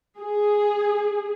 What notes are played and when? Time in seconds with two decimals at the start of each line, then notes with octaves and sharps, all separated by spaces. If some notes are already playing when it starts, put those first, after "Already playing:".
0.19 G#4